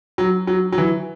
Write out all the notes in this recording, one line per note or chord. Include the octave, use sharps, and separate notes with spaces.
F#3
F#3
F#3
E3